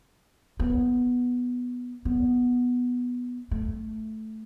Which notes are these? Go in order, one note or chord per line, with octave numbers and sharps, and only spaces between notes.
B3
B3
A3